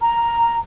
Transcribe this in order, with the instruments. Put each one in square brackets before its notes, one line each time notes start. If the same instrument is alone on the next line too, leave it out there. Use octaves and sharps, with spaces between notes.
[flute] A#5